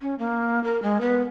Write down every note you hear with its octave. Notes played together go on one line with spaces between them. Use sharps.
C#4
A#3
A#4
G#3
B3